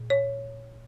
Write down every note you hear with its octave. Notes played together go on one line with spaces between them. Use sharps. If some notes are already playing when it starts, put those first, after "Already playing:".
Already playing: A#2
C#5